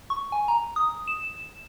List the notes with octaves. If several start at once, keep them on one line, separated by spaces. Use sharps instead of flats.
C#6
G#5
A#5
D#6
E7